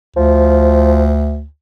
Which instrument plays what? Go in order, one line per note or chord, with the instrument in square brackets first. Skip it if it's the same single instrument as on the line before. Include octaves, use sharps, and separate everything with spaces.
[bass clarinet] D2 [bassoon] F3